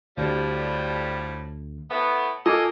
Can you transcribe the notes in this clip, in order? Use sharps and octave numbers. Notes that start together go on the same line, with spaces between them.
D2 A2 F3 G3
A2 A3 B3
A#3 F4 A4 D#5 G#5 A5